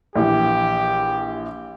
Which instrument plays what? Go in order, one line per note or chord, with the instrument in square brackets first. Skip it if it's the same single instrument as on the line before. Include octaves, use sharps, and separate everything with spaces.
[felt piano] A#1 E3 [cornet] G4